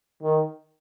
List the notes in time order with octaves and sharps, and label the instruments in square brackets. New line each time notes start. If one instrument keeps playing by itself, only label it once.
[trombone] D#3